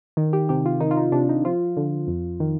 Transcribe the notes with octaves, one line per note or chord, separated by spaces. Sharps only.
D#3
G4
C3 G4
F4
D#3 D#4
F4
D#4
C3 D4
D#4
F3 F4
D3
F2
D#3